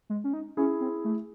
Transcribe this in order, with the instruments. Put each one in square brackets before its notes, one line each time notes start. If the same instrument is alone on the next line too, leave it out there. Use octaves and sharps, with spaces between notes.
[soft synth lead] G#3
C#4
D#4
[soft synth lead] C#4 [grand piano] E4 G#4
[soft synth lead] C4
A3